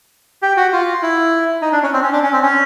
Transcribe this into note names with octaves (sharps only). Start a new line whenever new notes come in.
G4
F#4
F4
E4
D#4
D4
C#4
C4
C#4
D4
C#4
C4
C#4